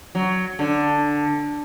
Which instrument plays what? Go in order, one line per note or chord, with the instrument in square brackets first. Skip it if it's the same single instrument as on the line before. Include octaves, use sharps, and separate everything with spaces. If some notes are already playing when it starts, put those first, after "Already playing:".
[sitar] F#3
D3